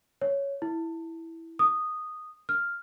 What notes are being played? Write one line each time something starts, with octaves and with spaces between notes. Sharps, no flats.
C#5
E4
D#6
F6